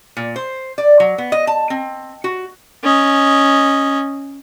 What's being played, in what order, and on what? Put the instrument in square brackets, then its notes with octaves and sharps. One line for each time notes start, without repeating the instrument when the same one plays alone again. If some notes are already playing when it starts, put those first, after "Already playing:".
[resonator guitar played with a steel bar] A#2
C5
D5
F#3
B3
D#5
A5
C4
F#4
[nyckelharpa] C#4 D#5